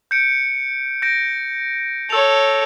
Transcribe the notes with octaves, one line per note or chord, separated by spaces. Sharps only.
G6 C#7 D7
G6 A#6 D7
A4 C#5 E6 F7